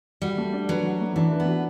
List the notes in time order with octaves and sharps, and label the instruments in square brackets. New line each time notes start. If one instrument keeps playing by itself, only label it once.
[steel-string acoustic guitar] G3 [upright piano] F#4
[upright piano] A3
D4
[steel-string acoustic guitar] F#3 [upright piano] B4
[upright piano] F#4
A3
[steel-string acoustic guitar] E3 [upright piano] D4
[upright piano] B4
[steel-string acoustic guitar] B3
[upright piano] F#4